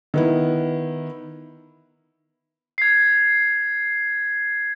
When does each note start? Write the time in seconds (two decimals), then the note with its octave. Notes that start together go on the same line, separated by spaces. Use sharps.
0.14 D#3 B3 E4
2.78 G#6 C7